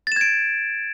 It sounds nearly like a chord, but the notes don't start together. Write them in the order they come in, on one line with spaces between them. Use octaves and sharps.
A6 E7 G#6 D7